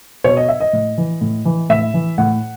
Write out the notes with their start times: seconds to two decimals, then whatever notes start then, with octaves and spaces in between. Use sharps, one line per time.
0.24 B2 C#5
0.37 D#5
0.49 E5
0.60 D#5
0.73 A2
0.98 E3
1.21 A2
1.45 E3
1.69 A2 E5
1.94 E3
2.18 A2 F#5